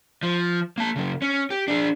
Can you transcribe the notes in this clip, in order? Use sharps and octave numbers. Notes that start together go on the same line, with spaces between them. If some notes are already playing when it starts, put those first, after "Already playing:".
F3
A#3 A5
C#3 F#3
C#4
G4
D4 G#4